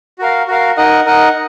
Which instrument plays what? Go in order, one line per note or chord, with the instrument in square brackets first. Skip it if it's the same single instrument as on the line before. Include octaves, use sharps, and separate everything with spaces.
[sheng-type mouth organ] F#4 A#4 F5
F#4 A#4 F5
D#4 A#4 D#5 F#5
D#4 A#4 D#5 F#5